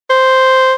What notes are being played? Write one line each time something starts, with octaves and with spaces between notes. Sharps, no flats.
C5